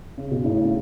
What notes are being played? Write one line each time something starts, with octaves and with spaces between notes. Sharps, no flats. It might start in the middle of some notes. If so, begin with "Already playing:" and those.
C#3
B2
A2 C#3